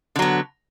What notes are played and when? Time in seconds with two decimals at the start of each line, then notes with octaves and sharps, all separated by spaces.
0.16 D3
0.19 F#3
0.22 B3